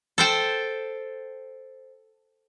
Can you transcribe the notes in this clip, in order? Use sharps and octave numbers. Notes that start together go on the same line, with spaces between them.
A4 C5 G5